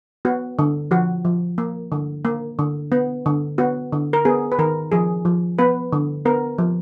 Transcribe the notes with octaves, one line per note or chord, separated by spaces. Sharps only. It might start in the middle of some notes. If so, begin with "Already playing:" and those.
B3 F#4
D3
F3 F#4
F3
A#3
D3
A#3
D3
B3
D3
B3 F#4
D3
A#4
B3 G#4
B4
D#3 A#4
F3 G#4
F3
B3 B4
D3
B3 A#4
F3